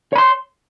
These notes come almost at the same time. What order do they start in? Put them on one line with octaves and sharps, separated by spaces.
C#5 B5 C6